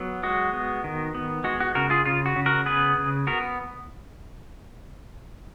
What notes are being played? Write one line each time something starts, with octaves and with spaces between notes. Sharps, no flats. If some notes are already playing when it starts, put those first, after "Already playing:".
Already playing: F#3 B3
G#3 F#4
B3
D#3
B3
G#3 F#4
F#4
C#3 F#4 A#4
F4 G#4
C#3 F4
F#4
C#3
F#4 A#4
B3 G#4 B4
C#3
B3 F#4 A#4